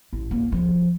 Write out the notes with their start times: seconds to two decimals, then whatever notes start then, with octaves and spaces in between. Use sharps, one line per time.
0.13 A1
0.31 A#3
0.52 F3